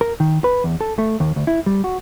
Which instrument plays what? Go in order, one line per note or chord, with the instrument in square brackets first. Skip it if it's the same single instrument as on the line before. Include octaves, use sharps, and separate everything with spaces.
[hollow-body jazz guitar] A#4
D#3
B4
E2
A4
A3
D#2
D2
E4
G3
F#4